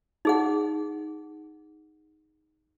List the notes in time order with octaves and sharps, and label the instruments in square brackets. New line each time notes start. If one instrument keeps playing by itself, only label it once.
[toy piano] D#4 G#4 F#5